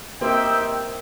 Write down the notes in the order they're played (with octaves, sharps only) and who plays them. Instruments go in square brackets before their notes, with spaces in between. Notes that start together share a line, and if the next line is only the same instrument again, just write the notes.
[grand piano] A#3 C4 [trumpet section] D#4 G4 C5 E5 G5